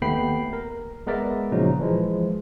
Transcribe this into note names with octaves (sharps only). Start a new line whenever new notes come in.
D#2 A3 B3 G5 B5 C7
A#4
G#3 B3 A#4 D5 E5
A#2 C#3 F3 F#3 D#4
E3 F3 G#3